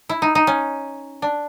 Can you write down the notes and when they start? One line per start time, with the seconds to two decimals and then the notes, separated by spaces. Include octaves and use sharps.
0.09 E4
0.22 D#4
0.35 D#4
0.47 C#4
1.22 D4